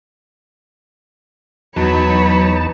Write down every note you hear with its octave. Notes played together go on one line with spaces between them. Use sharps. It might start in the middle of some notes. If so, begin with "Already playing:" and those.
E2 F#3 D#4 B4 C#5 A5 B5